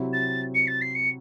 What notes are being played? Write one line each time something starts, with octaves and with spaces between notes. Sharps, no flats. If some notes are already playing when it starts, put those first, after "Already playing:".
Already playing: C3 F#3 C4 E4
A6
C#7
A6
C7
C#7